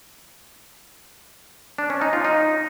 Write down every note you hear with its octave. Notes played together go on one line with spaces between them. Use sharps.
D4
C#4
D#4
F4
D#4